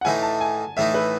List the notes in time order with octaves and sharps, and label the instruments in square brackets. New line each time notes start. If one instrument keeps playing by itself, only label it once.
[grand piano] F#5
[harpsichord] A2 E3 A3 D#4 [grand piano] G#5
[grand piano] A5
G#5
[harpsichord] A2 E3 A3 D#4 [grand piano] E5
[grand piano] B4